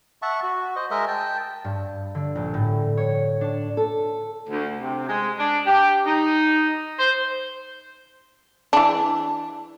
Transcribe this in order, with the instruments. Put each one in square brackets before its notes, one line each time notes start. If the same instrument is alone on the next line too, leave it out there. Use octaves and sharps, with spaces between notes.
[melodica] E5 F#5 A5 C#6
F#4
C5 D#5
G#3 A#4 D#5 E5
G5 A5
[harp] G2
D3
A#1
A2
C#5
D4
[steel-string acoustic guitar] A4
[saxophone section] D2
C3
G#3
D4
G4
D#4
C5
[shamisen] E3 D4